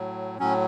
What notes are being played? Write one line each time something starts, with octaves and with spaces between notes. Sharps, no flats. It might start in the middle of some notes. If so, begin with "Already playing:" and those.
Already playing: A2 F#3
A2 F#3 C#4